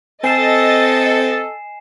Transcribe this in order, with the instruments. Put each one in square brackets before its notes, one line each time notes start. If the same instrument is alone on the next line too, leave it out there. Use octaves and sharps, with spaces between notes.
[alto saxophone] C4 [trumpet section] A4 [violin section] D#5 A6 [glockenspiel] G#5 C7 E7